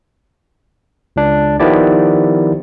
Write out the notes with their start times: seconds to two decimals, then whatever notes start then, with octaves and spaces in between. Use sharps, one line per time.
1.16 C#2 D4
1.60 D#3 F3 B3 E4 G4 D5